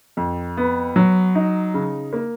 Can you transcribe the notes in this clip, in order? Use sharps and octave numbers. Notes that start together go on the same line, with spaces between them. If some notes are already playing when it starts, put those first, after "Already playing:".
F2
B3
F#3
D#4
C#3
A#3